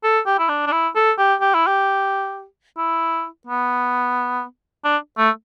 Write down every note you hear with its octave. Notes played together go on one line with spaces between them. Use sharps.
A4
G4
E4
D4
D4
E4
A4
G4
G4
E4
G4
E4
B3
D4
A3